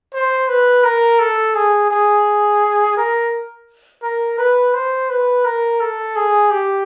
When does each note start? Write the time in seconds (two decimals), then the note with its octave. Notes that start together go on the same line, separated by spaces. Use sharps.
0.13 C5
0.48 B4
0.84 A#4
1.19 A4
1.55 G#4
1.91 G#4
2.97 A#4
4.02 A#4
4.38 B4
4.74 C5
5.09 B4
5.45 A#4
5.80 A4
6.16 G#4
6.50 G4